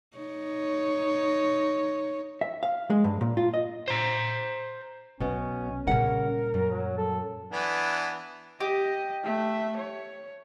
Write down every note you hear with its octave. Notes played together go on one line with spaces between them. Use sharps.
D#4 C#5
E5
F5
G#3
G2
A#2
F4
D#5
C5 A#5
B1 B2 B3 C#4
A#2 C#3 G3 C#4 A#4 F#5
F#2
F#3
A4
E3 B3 D4
G4 D#5
A3 E5
C#5